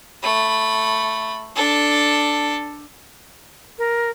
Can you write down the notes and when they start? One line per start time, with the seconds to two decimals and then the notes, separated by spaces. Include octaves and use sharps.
0.23 A3 B5
1.56 D4 A4
3.78 A#4